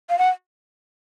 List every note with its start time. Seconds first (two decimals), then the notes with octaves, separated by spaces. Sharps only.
0.10 F5
0.19 F#5